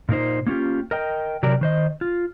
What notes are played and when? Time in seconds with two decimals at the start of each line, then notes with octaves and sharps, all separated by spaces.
0.09 A#2 A#3 D#4 C5
0.46 A#3 C#4 F4 G4
0.91 A#4 D#5 G5
1.43 C3 F#3 G4 A#4 D5
1.61 D#3 C5 D#5
2.01 F4